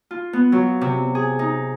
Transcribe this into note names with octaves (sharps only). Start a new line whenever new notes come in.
F4
B3
F#3
C3
G#4
D#4